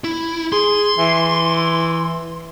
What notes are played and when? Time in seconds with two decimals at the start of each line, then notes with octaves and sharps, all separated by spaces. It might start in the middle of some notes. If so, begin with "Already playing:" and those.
0.04 E4
0.52 G#4 C6
0.98 E3